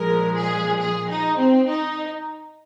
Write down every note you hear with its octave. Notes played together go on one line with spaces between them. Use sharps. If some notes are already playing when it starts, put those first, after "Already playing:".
Already playing: A#2 F3 G#3 A#4
G#4
G#4
D#4
C4
D#4